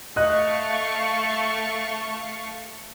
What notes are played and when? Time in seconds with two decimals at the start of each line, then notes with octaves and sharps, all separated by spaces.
0.16 A3 D#5 F5 C#6 F#6